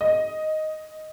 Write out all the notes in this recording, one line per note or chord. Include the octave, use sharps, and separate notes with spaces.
D#5